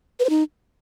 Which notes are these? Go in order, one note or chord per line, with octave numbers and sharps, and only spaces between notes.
B4
C5
D#4